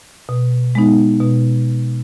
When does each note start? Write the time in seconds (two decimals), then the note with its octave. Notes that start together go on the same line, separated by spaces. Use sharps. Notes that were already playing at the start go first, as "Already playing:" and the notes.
0.29 B2
0.75 G#3 B3 D#4
1.20 B2